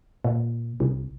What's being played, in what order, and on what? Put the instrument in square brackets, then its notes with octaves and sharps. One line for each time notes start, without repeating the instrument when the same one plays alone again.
[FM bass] A#2
C2